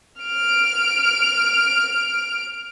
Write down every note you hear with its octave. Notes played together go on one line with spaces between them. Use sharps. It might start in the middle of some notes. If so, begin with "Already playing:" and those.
F6 D7